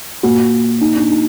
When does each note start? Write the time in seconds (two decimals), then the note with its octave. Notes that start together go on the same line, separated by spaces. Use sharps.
0.23 A#2 F#4
0.81 A#2 D#4
0.96 D4
1.10 D#4